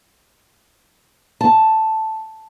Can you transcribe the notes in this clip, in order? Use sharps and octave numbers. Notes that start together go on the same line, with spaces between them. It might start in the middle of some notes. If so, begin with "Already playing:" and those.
A5